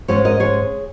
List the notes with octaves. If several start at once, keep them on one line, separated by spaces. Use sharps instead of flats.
G#2 G#3 C#4 G#4 C#5
A#4 D#5
G#4 C#5